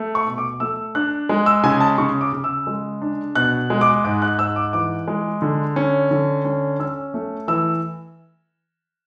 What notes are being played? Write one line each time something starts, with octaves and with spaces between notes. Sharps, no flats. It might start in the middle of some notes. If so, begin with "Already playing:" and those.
Already playing: A3
C#6
B2
D6
A3 E6
D4 F#6
G#3
E6
C#3 G#5
A5
C#3 C#6
D6
C#3
E6
G#3
D4
B2 F#6
G#3
D6
G#2 D6
F#6
G#2 E6
D6
E3 D6
G#3
D3
C#4
D3
C#4
C#4 E6
A3
E3 E6